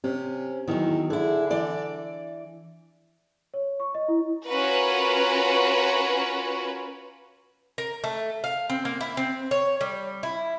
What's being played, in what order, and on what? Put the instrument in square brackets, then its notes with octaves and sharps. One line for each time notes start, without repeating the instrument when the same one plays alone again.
[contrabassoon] C3 [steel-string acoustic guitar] C#4
[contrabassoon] E2 [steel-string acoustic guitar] D#3 F#3
[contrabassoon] D3 [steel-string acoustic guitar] E4 G#4
[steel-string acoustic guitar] E3 D5
[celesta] C#5
C#6
D#5
E4
[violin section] C#4 F4 F#4 A#4 B4
[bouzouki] A#4
A3
F5
C4
A#3
E4
C4
C#5
G3
E4